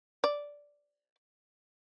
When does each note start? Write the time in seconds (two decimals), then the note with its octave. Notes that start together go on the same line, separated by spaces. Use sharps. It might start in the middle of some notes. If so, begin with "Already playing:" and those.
0.24 D5